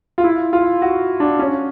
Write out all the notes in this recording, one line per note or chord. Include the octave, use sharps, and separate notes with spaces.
F4
E4
F4
F#4
D4
C#4